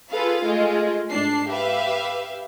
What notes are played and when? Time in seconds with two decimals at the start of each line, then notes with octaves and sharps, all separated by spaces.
0.12 F4 G#4 A4 B4 F5
0.43 G#3 A3 F4 G#4
1.09 G#2 D4 A5 C7
1.50 G4 B4 E5 F5